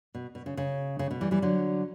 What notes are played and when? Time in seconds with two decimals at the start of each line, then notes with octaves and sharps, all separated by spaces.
0.15 B2
0.35 B2
0.46 C#3
0.57 C#3
0.99 C#3
1.11 B2
1.21 E3 G3
1.31 E3 G3
1.42 D3 F#3